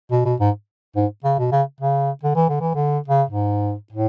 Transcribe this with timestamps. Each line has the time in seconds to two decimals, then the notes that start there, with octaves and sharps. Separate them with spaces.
0.11 B2
0.25 B2
0.40 G#2
0.96 G#2
1.24 C#3
1.39 B2
1.52 C#3
1.81 C#3
2.23 D3
2.35 E3
2.49 D3
2.61 E3
2.75 D3
3.08 C#3
3.29 G#2
3.92 A2